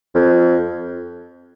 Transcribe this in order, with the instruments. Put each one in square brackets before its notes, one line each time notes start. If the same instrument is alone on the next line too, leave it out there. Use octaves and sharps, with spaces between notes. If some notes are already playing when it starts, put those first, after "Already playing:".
[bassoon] F2